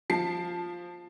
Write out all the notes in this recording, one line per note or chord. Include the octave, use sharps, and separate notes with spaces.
F3 A5 C7